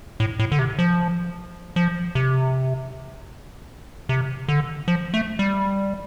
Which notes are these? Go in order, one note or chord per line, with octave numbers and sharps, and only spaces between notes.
A2
A2
D3
C3
F3
F3
C3
C3
D3
F3
A3
G3